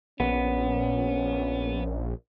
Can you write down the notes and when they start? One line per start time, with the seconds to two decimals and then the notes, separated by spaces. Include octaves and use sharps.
0.20 A#1 B3 C#4